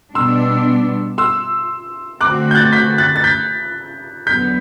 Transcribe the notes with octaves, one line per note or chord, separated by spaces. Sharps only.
B2 G3 B3 D4 C6 E6
C6 E6
D3 A3 C4 F#4 D6 F#6
G6
F#6 A6
G6 B6
F#6 A6
A6
G6 B6
E2 D3 F#3 B3 G6 B6